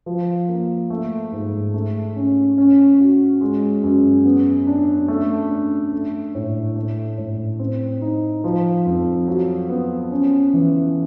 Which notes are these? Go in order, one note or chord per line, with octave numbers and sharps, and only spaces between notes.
F3
A#3
A3
G#2
A3
C#4
C#4
F#4
G#3
F#2
B3
D4
A3
D4
A3
A2
A3
A2
C4
D#4
F3
F2
F#3
B3
C#4
E3